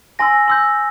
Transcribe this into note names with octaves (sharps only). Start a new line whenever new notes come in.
G#5 C6 E6 A#6
C6 E6 G6